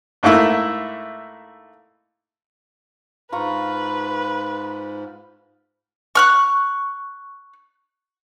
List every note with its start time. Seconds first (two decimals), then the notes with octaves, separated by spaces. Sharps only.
0.23 G#2 A3 A#3 E4
3.32 G#2 F4 B4 A#5 C#6
6.15 C#6 F6 F#6